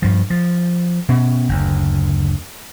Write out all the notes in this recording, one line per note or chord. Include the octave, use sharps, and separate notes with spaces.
G2 F3
F3
B2 C#4
F#1 D2